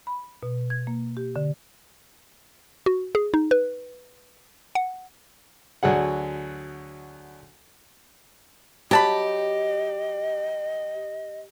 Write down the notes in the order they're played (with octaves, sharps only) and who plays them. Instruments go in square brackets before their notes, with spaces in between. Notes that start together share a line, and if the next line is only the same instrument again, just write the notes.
[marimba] B5
B2
G#6
A#3
G4
D3
[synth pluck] F#4
G#4
D#4
B4
F#5
[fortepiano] D2 F#3 G#4 F#5
[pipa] F#3 A5 B5 [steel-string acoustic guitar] G4 [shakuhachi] D#5